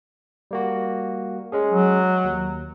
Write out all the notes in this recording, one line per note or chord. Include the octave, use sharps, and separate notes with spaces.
G3 A#3 F#4
G#3 C#4 G#4
F#3
D#2